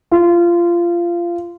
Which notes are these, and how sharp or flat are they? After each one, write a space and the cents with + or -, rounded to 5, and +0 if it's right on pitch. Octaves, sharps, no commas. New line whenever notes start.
F4 -20